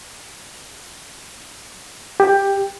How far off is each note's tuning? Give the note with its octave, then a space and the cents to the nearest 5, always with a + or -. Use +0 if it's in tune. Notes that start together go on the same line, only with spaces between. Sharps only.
G4 +10